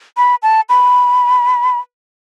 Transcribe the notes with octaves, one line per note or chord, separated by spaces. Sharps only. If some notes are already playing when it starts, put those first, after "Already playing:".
B5
A5
B5